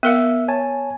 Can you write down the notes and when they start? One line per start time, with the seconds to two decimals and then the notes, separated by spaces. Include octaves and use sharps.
0.03 B3 A#4 E5 F5
0.48 C#5 G#5 A5